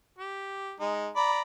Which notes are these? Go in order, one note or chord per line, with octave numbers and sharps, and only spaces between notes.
G4
G#3 D#4
D5 A#5 B5